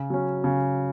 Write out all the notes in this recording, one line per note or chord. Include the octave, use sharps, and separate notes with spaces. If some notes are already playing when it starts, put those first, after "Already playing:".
Already playing: C#3
F#3 C#4
C#3